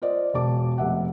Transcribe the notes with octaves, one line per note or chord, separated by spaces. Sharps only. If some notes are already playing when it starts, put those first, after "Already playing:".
F4 C5 D5 D#5
E1 A5 D6
F1 E5 F#5